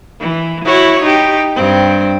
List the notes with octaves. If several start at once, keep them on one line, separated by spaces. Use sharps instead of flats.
E3
E4 F#4 C#5
D#4 G4
G2 C4